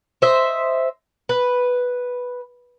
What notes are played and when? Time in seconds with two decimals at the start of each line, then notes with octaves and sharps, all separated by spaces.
0.22 C5 D#5 E5
1.29 B4